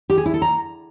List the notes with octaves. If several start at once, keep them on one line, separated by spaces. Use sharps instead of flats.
G4
G#4
E4
A4
A#5